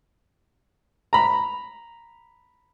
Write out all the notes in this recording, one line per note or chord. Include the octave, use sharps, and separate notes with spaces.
A#5 B5